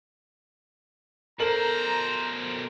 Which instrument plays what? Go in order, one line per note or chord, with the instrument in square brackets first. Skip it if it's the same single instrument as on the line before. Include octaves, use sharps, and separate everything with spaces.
[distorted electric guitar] B2 C5 [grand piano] A4 A#4 F#7 [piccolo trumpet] A#5